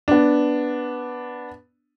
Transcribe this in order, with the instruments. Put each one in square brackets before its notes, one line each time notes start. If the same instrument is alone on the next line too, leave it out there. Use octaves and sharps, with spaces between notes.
[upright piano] B3 D4